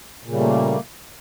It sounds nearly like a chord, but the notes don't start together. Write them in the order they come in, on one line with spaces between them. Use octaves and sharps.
A#2 C#3 G3 A3 A#3